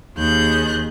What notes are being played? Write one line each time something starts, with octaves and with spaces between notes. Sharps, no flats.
D#2 G#4 F#6 G6